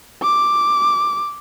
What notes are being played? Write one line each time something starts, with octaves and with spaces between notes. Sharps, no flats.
D6